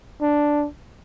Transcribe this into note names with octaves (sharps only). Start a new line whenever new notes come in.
D4